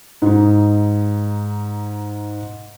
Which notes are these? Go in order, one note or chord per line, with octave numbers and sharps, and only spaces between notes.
G#2 D#4